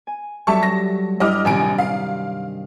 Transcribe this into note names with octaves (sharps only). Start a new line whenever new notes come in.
G#5
F#3 G3 A4 E5 A5 C#6
A#6
G2 G3 E4 D#5 D6 F6
A#1 C3 D#3 G#5 A#5 D7
F5